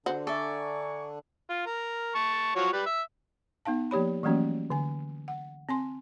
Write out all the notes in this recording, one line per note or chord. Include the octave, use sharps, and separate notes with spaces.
D3 D4 F#4 C5
A4 D5 E5 G#5 A#5 C#6
F4
A#4
A5 C#6
F3 F#3 C#5
G3 B4
E5
B3 D#4 F5 A5
F3 A#3 G4 C#5 B5
E3 F#3 A3 A#3 C#4 F#4
D3 G#5
F#5
C4 G#5 C6